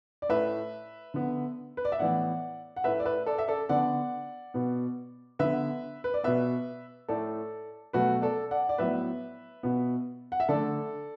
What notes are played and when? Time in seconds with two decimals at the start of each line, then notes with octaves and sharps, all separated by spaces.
0.22 D5
0.29 A2 A3 B4 E5
1.14 D3 B3
1.77 B4
1.85 D5
1.92 E5
1.99 A2 E3 B3 D5 F#5
2.76 F#5
2.84 A2 A3 B4 E5
3.00 D5
3.05 B4 E5
3.26 A4 D5
3.38 E5
3.47 A4 D5
3.69 D3 B3 D5 F#5
4.54 B2 B3
5.39 D3 B3 B4 E5
6.04 B4
6.14 D5
6.24 B2 B3 B4 E5
7.08 A2 A3 A4 D5
7.93 B2 F#3 A3 F#4 B4
8.22 A4 D5
8.51 D5 F#5
8.69 D5
8.78 A2 F#3 B3 B4 E5
9.63 B2 B3
10.32 F#5
10.40 E5
10.49 D3 A3 A4 D5